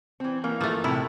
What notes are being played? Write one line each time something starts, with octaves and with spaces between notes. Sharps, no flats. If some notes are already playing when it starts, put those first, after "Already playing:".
E3 C4
E3 A#3
F3 A3
A2 C3 E4